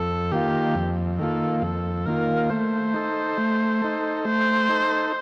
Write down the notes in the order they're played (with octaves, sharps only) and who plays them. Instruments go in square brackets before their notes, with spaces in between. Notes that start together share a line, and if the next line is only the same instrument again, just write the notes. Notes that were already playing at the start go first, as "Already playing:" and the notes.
Already playing: [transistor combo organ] F2 [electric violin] A4
[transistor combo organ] D#3 A#3 F4 [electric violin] G4
[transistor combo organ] F2
[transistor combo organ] D#3 A#3 F4 [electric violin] A4
[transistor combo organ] F2 [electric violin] A4
[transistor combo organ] D#3 A#3 F4 [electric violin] A#4
[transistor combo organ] A3 [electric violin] C5
[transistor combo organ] D#4 A4
A3
D#4 A4
[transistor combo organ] A3 [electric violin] C5
[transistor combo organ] D#4 A4